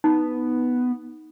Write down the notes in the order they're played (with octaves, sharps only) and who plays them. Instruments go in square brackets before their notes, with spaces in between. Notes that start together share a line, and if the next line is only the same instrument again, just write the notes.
[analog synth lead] B3 [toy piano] D#4